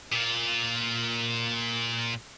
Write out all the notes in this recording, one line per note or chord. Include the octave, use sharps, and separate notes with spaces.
A#2 F4